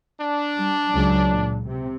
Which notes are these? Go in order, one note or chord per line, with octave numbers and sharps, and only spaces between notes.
D4
G3
C#2 F#3
A#2
C3